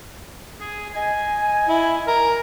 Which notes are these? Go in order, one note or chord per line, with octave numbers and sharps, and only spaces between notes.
G#4
D#5 G#5
E4
A#4